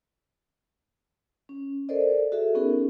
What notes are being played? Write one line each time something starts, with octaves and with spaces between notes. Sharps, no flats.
C#4
A4 A#4 C5 D5 D#5
F#4 G#4 A4 E5
B3 C#4 D#4 G#4 A#4